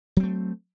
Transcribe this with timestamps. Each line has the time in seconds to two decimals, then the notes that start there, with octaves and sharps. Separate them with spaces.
0.17 F#3
0.20 C4
0.23 A3